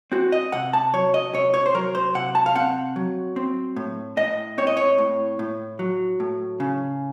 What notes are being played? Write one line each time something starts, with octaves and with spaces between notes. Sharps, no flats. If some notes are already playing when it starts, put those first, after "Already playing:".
C4 F#4
D#5
C3 F#5
A5
F#3 C#5
D#5
C3 C#5
C#5
C5
F#3 A#4
C5
C3 F#5
A5
F5
C4 F#5
F#3
C4
A2
A2 D#5
C4 C#5
D#5
C#5
A2
A2
F#3
A2
C#3